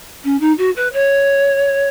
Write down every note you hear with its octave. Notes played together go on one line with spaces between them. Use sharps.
C#4
D#4
F#4
B4
C#5